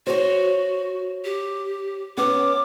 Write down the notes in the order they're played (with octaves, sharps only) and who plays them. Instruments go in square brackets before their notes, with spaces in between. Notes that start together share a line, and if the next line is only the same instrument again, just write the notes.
[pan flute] F#4 [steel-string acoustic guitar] C5 C#5
[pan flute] G4
[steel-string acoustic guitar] B3 C#4 [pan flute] D6